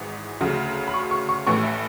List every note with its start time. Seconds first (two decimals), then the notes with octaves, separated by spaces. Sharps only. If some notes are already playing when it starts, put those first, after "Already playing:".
Already playing: G#1 G#2 E3
0.41 D2 C#3 F#3
0.88 B5
0.94 C#6
1.11 C#6
1.29 C#6
1.47 A1 A2 E3 C#6
1.63 E5